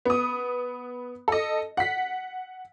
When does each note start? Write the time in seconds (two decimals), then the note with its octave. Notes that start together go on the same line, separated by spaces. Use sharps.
0.05 B3 D#6
1.28 A4 D#5
1.77 F#5 B6